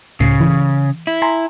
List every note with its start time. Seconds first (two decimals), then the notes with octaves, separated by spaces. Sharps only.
0.20 C#2 A2 C#3 C7
0.41 E3
1.07 E4
1.22 G#5 A#5 C6